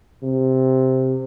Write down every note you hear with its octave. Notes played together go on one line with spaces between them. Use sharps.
C3